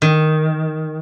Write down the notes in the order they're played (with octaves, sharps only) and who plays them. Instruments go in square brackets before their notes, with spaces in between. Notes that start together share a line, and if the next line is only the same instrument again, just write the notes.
[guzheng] D#3